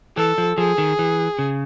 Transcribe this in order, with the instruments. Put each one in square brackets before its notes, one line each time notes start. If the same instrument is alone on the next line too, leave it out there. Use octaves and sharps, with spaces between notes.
[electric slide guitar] E3 [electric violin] A4
[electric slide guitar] F3
[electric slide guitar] F3 [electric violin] G#4
[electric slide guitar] D#3
E3
C#3